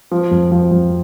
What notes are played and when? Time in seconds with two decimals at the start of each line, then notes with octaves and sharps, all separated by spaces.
0.11 F3
0.31 F2
0.52 F3
0.71 F2